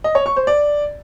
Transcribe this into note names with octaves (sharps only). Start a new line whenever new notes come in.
D#5
C#5
C#6
C5
D5